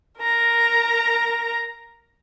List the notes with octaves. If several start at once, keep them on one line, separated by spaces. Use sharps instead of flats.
A#4 A#5